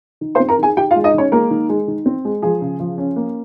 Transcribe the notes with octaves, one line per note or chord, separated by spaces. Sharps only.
D#3
C5 C6
C4
A#4 A#5
D#3 G#4 G#5
D#3 G4 G5
F4 F5
G#3
D#4 D#5
D#3 C#4 C#5
G#3 A#3 A#4
D#3
G#3
D#3
C4
G#3
F3 G#4
C#3
F3
C#4
A#3